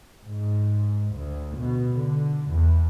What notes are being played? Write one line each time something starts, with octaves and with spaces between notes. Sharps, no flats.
G#2
D2
B2
D3
E2